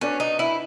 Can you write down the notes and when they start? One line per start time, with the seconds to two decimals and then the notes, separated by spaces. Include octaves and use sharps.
0.01 C#4 D4 F#4 B4 D5
0.20 D#4
0.39 E4